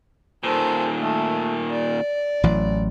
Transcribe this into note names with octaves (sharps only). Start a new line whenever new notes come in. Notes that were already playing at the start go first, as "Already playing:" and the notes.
A#2 D#3 A4 C5
A3
D5
A1 E3 F#3